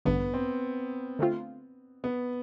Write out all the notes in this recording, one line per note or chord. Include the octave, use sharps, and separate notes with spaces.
A1 G2 D3 B3
C4
D3 A3 C4 F4
B3